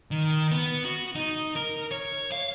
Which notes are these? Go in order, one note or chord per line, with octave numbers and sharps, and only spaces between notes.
D#3
B3
F#4
D#4
A#4
C#5
F5